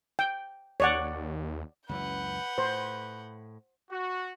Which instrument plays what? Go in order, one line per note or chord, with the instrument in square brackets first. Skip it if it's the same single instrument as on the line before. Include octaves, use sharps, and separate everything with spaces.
[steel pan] G5
[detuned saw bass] D#2 [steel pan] C#5 D5 F#5
[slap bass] C#2 F#2 E3 [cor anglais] B4 [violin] F#5 G6
[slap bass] A2 [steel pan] C5
[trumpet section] F#4